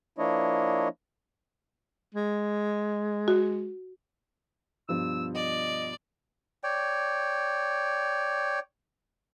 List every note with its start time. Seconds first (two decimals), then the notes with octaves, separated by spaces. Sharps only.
0.18 F3 A#3 D4 E4 C#5 D#5
2.15 G#3
3.28 F#4
4.89 G2 B2 F3 E6
5.35 D5 D#5
6.63 C#5 D5 G5